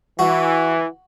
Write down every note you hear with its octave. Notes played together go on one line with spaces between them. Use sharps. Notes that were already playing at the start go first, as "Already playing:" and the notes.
E3 F#4